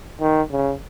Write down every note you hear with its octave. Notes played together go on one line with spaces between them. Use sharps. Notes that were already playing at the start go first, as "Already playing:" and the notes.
D#3
C#3